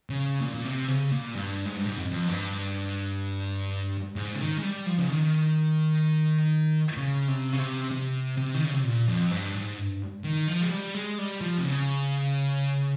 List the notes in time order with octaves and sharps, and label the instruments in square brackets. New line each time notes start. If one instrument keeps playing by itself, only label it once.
[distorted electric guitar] C#3
A#2
A#2
C3
C#3
A#2
G2
G#2
G2
G#2
F2
F2
G2
G#2
C#3
D#3
G#3
G3
F3
C#3
D#3
C#3
C3
C#3
C3
C3
C3
D#3
C#3
C3
A#2
F2
G2
G#2
G2
D#3
F3
G#3
G3
G#3
G3
F3
C3
C#3